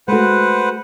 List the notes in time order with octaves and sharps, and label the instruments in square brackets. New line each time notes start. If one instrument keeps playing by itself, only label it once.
[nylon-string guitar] G#3 A3 F#4 [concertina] B4 C5 F#5